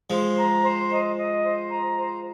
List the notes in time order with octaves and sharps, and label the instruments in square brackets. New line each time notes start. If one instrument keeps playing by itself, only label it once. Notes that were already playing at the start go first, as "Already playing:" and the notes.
[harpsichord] F3 G#3 [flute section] C5
[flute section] A#5
C5
D#5
D#5
C5
A#5
C5